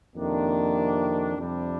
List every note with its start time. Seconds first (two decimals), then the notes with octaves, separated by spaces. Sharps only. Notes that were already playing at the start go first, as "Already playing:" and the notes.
0.15 F2 C3 D#3 A#3 D4
1.37 F2 C3 G3 D4